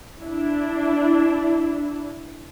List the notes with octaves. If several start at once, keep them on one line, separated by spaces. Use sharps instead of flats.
D4 E4